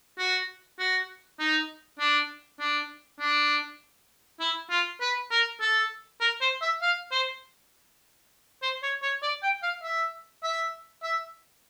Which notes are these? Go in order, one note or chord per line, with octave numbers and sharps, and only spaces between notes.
F#4
F#4
D#4
D4
D4
D4
E4
F4
B4
A#4
A4
A#4
C5
E5
F5
C5
C5
C#5
C#5
D5
G5
F5
E5
E5
E5